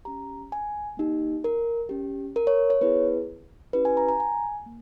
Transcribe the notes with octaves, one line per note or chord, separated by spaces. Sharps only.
C#4 G4 A#5
G#5
A#3 D#4 G4
A#4
C#4 G4
A#4
C#5
C#5
B3 E4 G#4 B4
C#4 E4 G4 B4
G#5
A#5
A#5
G#5
A#3